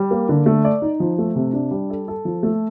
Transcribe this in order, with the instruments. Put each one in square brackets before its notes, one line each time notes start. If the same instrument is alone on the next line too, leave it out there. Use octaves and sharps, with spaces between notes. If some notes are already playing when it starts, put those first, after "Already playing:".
Already playing: [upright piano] G3
A#3
D3
A3
D5
D#4
F3
A3
C3
D4
G3
A4
A4
F3
A3